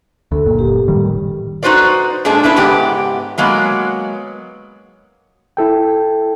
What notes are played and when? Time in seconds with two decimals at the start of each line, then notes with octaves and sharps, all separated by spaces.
0.32 D2 A4
0.45 F#1 A#2
0.59 G4
0.88 A2 D#3 G3
1.63 D#4 F#4 B4 C5 D5
2.25 A#2 G#3 D4 G#4 A5
2.43 B3 D4 E4 B4
2.56 G#2 C#3 B3 G4
3.38 F#3 G#3 A#3 B3
5.57 E4 A4 G5